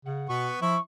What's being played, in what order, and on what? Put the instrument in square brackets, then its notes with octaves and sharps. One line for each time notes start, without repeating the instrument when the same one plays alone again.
[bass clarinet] C#3 [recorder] F#5
[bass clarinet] B2 [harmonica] B3 B4 C#6
[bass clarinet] F3 [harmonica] E4 E5 [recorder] C#6